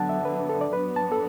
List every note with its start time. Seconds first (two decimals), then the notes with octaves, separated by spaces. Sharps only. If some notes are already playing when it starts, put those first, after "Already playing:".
Already playing: D3 F#3 B3 F#5 A5
0.09 E5
0.25 B4
0.49 A4
0.61 D5
0.72 F#3 B3 D4 F#4 B4
0.96 A5
1.12 A4